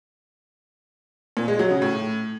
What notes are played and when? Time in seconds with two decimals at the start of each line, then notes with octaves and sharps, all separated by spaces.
1.37 A#2
1.48 G#3
1.59 F#3
1.70 C#3
1.82 A2